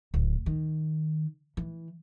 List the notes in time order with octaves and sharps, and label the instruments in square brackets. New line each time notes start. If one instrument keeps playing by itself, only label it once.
[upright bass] D1
D#3
E3